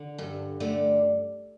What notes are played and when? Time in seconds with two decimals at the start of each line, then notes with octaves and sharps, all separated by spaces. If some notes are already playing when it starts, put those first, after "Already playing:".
Already playing: D3
0.18 G2 A4
0.60 D3 A3